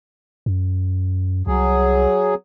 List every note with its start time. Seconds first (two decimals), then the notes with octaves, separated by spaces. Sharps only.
0.46 F#2
1.47 C2 F#3 G#4